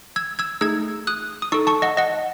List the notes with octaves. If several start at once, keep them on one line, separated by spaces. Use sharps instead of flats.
E6 G#6
E6 G#6
A3 D#4 G#4 E6 G#6
D#6 F#6
D#6
D#4 A4 C#6 E6
A5 C#6
D#5 F#5
D#5 F#5